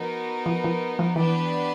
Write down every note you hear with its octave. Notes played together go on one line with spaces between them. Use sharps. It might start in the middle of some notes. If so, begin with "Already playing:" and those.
Already playing: F3 B3 D#4 F#4 A#4
F3
F3
F3
E3 B3 D4 G4 B4 D5